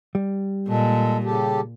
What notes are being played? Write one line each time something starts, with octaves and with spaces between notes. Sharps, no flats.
G3
A#2 G#3 A4
C#3 G4 A4